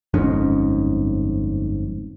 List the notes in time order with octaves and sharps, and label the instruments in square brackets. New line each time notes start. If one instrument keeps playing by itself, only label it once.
[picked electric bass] G1 F2 G#2 C#4